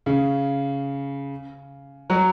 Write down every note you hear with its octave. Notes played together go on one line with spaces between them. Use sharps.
C#3
F#3